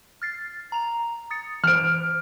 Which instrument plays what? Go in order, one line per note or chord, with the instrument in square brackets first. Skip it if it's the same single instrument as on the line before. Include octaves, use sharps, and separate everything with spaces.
[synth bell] F6 A6 C7
A#5 F7
D#6 A6 C#7
[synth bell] E3 C5 [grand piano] F6 D7